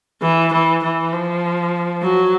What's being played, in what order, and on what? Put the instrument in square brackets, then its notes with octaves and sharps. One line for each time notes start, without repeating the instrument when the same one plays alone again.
[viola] E3
E3
E3
F3
F#3